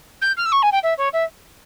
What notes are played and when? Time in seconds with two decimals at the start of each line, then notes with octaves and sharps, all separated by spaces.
0.21 G6
0.37 F6
0.45 E6
0.52 C#6
0.62 G#5
0.72 G5
0.83 E5
0.98 C#5
1.13 E5